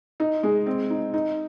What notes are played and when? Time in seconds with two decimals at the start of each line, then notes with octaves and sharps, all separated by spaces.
0.20 D#4
0.43 G#3
0.66 C4
0.90 D#4
1.14 D#4